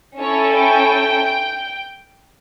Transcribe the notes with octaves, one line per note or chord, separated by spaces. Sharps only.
C#4 E4 A4 C#5
G5